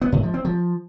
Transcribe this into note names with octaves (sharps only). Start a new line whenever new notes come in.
B3
G#2
F3
C4
F3